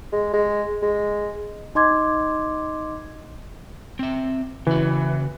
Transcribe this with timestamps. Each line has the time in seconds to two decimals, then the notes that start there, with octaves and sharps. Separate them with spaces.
0.12 G#3
0.34 G#3
0.83 G#3
1.75 D#4 D#5 C6 D6 G#6
3.99 C4 E5
4.67 C#3 E3 F#4